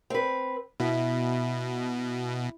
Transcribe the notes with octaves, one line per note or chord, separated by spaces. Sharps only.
C4 B4
B2 E4